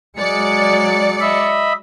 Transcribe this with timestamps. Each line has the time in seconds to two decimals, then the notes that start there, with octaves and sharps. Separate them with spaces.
0.18 F#3 G#3 D5 C#7
1.21 D#5 E5 B5